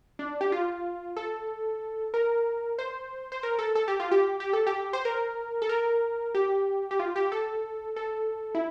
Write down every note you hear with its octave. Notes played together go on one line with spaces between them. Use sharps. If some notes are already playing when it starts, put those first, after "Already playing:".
D4
G4
F4
A4
A#4
C5
C5
A#4
A4
A4
G4
F4
G4
G4
A4
G4
C5
A#4
A4
A#4
G4
G4
F4
G4
A4
A4
E4